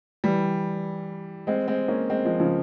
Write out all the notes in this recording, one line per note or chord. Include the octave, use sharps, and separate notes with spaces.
E3 G3
G#3 C4
G#3 C4
A#3 C#4
G#3 C4
F3 G#3
C#3 F3